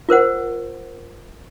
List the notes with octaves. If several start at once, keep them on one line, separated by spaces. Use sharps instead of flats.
F4 A#4 C5 F#5